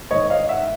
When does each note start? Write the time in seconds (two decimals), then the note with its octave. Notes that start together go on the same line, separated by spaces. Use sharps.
0.11 G#2 D#3 C#5 D#5
0.30 D#5 F5
0.49 E5 F#5